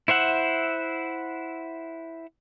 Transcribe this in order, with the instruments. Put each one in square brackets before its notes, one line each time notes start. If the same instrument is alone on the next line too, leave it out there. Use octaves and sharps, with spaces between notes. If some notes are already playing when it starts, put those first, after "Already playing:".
[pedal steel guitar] E4 C5 E5 F#5